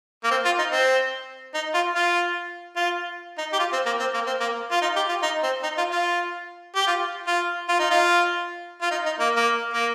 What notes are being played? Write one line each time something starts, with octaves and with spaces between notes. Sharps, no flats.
A#3
C4
F4
D#4
C4
D#4
F4
F4
F4
D#4
G4
F4
C4
A#3
C4
A#3
C4
A#3
F4
D#4
G4
F4
D#4
C4
D#4
F4
F4
G4
F4
F4
F4
D#4
F4
F4
D#4
D#4
A#3
A#3
A#3